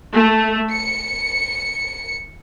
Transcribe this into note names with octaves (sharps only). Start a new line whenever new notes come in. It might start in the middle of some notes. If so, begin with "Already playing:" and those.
A3
C#7